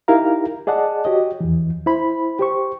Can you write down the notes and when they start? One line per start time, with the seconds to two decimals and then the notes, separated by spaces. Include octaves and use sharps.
0.08 D#4 E4 G4 A#4 F5 A#5
0.67 G#4 D5 D#5 F#5 A5
1.05 F#4 G4 C#5 D#5
1.41 E2 E3
1.86 E4 C5 B5
2.39 G4 C5 C#6